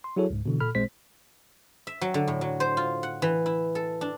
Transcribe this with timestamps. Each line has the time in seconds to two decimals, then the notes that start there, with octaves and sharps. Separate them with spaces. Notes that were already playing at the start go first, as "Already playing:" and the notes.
0.04 C6
0.16 F#3 E4 F#4 G#4 A4 C#5
0.30 C#2 G#2
0.46 B2 D3 E3
0.60 A#2 A4 B5 F6
0.75 A1 A#2 G#3 C4 C5 B6
1.87 E5
2.01 F#3
2.14 D3
2.28 A2
2.41 F#3
2.60 C5
2.77 F4
3.03 F#5
3.22 E3
3.46 E4
3.75 A4
4.01 D4